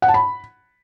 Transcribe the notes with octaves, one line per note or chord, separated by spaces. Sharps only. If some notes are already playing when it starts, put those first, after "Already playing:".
F#5
A5
B5